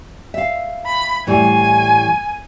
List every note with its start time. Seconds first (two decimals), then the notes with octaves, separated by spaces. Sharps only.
0.34 E5 F5
0.86 B5
1.27 A2 E3 G3 G#5